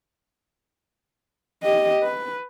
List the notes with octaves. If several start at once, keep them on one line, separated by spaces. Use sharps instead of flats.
G4 D#5
B4